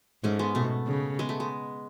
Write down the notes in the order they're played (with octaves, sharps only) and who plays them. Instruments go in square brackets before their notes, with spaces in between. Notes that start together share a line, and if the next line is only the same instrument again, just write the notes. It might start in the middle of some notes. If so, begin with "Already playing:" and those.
[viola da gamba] G#2 [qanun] A3 C#4
[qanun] G#3 B3
[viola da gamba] B2 [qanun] A3
[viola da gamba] C#3
[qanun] G#3 B3
A3
G#3